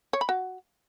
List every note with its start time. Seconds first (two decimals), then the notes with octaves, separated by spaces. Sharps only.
0.13 C#5
0.21 B5
0.29 F#4